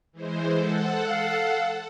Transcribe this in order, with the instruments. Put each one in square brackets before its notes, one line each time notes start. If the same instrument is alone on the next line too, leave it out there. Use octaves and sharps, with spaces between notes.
[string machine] E3 G#3 C5
A4 F#5
[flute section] F5 E6